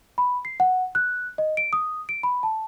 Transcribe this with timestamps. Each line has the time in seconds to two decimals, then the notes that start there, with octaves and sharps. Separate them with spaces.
0.18 B5
0.45 C7
0.60 F#5
0.95 F#6
1.38 D#5
1.57 D7
1.73 D#6
2.09 D7
2.23 B5
2.43 A5